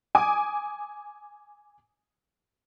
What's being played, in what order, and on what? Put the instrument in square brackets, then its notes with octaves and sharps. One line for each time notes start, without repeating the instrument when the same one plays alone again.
[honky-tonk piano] G#5 D6 D#6